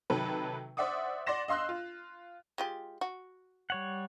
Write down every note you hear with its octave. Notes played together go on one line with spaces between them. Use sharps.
C3 D#3 F#3 A4 B4
C5 D5 E5 F#5 D6 D#6
D5 F#5 C6 A#6 E7
D#5 F5 C6 E6 F#6
F4
G#3 F4 G4
F#4
G3 C#5 F#5